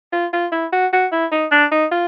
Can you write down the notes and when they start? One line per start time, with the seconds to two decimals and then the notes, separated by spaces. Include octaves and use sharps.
0.13 F4
0.33 F4
0.52 E4
0.73 F#4
0.93 F#4
1.12 E4
1.32 D#4
1.52 D4
1.72 D#4
1.92 F4